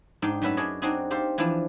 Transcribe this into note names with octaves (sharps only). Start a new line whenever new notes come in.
G#2 D4 D#4 G5
F#2 A3 C#4 B4 E5 F#5
D4 G#4 C#5 D#5
C4 D4 D#4 F#4 G#4
G4 A4 C5 F5
E3 F3 D4 E4